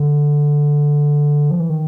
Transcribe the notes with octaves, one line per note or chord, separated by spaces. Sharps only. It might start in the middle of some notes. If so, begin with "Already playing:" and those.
Already playing: D3
F3
E3
D#3